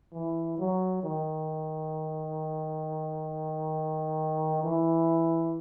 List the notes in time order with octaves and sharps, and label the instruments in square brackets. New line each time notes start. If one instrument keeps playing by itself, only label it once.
[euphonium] E3
F#3
D#3
E3